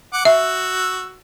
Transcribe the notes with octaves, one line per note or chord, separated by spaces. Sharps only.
F#5 D6
F#4 E5 E6